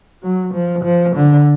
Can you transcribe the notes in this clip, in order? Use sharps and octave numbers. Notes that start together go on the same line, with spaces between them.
F#3
F3
F3
D3